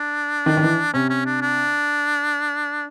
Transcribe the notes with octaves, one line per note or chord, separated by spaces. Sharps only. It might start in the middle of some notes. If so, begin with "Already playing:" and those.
Already playing: D4
D#3
D#3
E3
C3 C#4
C#4
D4
D4